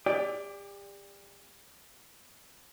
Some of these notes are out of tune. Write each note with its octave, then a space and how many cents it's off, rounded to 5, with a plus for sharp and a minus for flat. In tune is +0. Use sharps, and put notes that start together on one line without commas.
G4 +40 D5 +0